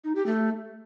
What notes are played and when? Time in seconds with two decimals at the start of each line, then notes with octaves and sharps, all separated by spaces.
0.04 D#4
0.15 G4
0.26 A3